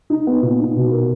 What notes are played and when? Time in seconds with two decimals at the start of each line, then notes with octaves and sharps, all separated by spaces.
0.10 D#4
0.27 B3
0.42 A#2
0.59 D#4
0.76 B2
0.92 A#4